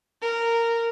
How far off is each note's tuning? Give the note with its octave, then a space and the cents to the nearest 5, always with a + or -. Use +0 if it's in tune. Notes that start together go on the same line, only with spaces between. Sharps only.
A#4 -10